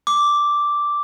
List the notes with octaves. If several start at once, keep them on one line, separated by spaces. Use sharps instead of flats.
D6